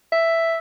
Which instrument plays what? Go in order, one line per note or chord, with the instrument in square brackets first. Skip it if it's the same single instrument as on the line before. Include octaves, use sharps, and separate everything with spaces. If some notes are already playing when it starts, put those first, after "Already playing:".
[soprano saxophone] E5